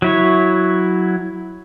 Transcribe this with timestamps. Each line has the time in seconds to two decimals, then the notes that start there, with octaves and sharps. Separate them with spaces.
0.02 F#3 E4 C#5